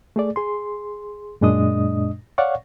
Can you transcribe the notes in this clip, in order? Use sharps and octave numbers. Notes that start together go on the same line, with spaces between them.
A3 G#4 D5
G#4 C6
F#2 A#2 G#3 D4 D#5 D#6
C#5 D5 F5 F#5 C#6